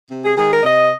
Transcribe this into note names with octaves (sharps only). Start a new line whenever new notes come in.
C3
G#4
D#3 G#3 G#4
A#4
C3 D#5